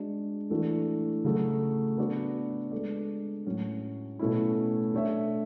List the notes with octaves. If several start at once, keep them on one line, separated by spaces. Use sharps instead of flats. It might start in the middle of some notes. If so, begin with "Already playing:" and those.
Already playing: G#3 D4 F#4
E3 A3 D4 F#4
C#3 F#3 A3
B3 D4 F#4 B4 D5
G#3 D4 A4 D5
A2 F#3 C#4
B2 A3 C#4 E4
A3 D4 A4 C#5 E5